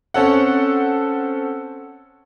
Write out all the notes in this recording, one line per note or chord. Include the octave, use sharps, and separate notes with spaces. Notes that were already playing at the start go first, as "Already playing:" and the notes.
C4 C#4 A4 F#5